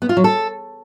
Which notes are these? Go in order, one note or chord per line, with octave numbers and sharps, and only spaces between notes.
B3
F4
F#3
A4